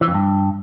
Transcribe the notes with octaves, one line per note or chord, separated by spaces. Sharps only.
E3
F2
G2